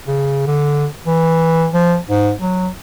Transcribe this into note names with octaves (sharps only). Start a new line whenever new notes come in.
C#3
D3
E3
F3
G#2
F#3